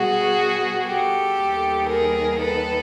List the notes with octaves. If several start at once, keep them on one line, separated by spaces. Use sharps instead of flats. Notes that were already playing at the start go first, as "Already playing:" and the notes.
Already playing: B2 G3 B3 F#4 G#4
G4 A4
D#2 D#3 G3 B3
G#4 A#4
A4 B4